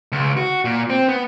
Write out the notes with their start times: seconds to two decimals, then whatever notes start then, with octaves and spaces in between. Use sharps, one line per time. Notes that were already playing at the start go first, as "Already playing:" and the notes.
0.12 C#2
0.37 F#4
0.65 A#2
0.90 C4
1.08 B3